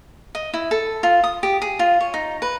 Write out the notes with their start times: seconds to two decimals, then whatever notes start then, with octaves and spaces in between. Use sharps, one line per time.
0.35 D#5
0.54 E4
0.71 A4
1.03 F4
1.24 D#6
1.43 G4
1.62 G#4
1.79 F4
2.01 C#5
2.14 D#4
2.42 B4